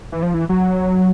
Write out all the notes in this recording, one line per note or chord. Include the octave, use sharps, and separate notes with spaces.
E3
F3
E3
F#3